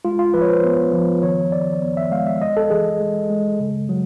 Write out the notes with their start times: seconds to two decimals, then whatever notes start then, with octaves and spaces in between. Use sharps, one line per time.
0.05 G#3 F4
0.19 F4
0.34 F3 B4
0.42 C#5
0.49 C5
0.64 B3
0.93 F3
1.23 D#3 C#5
1.52 D#3 D5
1.82 B3
1.97 E5
2.11 G#3 F5
2.27 E5
2.41 G#3 D#5
2.57 A4
2.70 E3 G#4
3.01 G#3
3.30 G#3
3.59 C#3
3.89 F#3